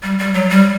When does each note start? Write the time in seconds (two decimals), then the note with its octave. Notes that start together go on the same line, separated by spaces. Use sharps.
0.03 G3
0.19 G3
0.34 F#3
0.50 G3